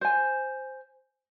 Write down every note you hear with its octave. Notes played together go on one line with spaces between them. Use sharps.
C5 G#5